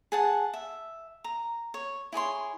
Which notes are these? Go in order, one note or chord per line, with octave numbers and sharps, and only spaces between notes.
G#4 F#5 A5
E5
A#5
C#5
E4 G#4 C#5 C6